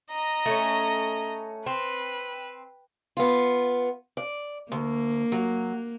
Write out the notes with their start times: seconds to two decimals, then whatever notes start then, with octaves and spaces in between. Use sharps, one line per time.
0.12 D#5 A#5
0.46 A3 C#4
1.66 C4 B4
3.17 B3 F4
4.17 D5
4.72 D2 A#3
5.32 F#3